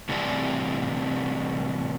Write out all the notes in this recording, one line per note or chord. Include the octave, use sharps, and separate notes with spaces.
A2 C3 E3 G3 C4 D5